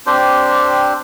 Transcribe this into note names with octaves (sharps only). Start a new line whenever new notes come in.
C4 D4 G4 C5